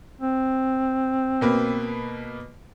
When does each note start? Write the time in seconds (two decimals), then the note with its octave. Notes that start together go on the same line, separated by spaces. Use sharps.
0.21 C4
1.41 B2 A#3 B4